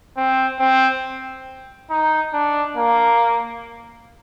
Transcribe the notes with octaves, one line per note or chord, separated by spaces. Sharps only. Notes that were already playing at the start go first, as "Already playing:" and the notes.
C4
C4
D#4
D4
A#3